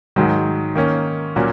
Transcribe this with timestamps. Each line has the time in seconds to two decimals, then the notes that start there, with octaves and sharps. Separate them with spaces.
0.16 G#2 D#3 F#3
0.75 D#3 A#3 C#4
1.36 A#2 F#3 A#3 C#4 F#4